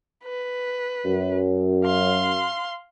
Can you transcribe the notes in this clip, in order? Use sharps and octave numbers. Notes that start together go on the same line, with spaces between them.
B4
F#2
F5 C6